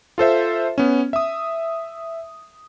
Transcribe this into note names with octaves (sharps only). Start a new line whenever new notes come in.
F4 A4 C5 E5
B3 C#4
E5 D#6